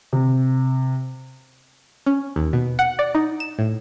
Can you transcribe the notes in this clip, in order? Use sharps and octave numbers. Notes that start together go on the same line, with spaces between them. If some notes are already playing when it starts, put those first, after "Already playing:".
C3
C#4
D#2
B2
F#5
D5
D#4
E7
A2